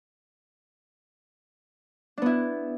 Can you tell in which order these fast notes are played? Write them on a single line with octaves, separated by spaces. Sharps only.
D4 B3 E4